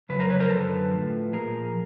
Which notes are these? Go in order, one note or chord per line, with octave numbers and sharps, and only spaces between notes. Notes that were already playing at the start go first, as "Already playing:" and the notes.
F2 C#3 F#3 B4
A#4 C5
B4 C#5
A#4 C5
F#2 D3 F#3 A4 B4
A2 F3
A#2 F3 G#4 A#4